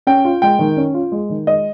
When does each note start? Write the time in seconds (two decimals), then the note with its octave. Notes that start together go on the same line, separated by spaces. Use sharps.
0.07 C#4 G5
0.25 F4
0.42 G#3 G5
0.59 D#3
0.77 C#4
0.94 F4
1.12 G#3
1.30 D#3
1.47 G#3 D#5